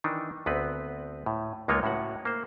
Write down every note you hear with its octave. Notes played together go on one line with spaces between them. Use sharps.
D#3 E3 D4 D#4
D2 B3 C4 B4
A2
C#2 G#3 A#3 D#4 F4 C#5
A2 C#4 F#4 F#5
A#3 C5